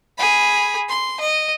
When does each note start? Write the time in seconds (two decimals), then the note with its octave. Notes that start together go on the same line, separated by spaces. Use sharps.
0.18 G#4 B5
0.89 C6
1.20 D#5